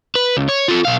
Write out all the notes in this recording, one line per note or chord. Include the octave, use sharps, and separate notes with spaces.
B4
C#2
C#5
F4 A4
B1 F5